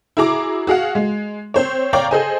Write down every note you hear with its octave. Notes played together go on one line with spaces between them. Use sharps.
E4 F#4 G#4 A#5 D6
F#4 G#4 F5 F#5
G#3
C4 C5 C#5
C#5 D5 F5 G5 A#5
G#4 A4 C5 D#5 G#5